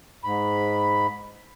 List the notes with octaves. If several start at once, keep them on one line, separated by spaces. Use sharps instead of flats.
G#2 B5